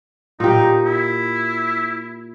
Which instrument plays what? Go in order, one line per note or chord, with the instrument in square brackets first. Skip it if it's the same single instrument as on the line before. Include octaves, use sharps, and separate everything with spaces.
[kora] A#2 G4 [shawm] D#4
[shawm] E4